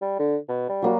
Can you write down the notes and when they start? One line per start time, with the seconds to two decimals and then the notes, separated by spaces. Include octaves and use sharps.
0.02 G3
0.19 D3
0.49 B2
0.69 G3
0.82 F#3 A#3 F#4